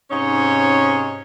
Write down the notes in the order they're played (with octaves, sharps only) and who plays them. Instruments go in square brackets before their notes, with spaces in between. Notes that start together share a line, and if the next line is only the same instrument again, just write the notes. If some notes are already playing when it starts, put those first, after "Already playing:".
[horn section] G#2 C3 C#4 D#4 C#5